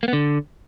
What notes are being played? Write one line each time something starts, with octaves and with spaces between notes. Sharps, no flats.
A#3
B3
D3